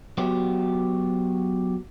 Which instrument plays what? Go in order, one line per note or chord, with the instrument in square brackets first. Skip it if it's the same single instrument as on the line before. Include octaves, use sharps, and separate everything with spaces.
[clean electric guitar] F#3 B3 F#4 G4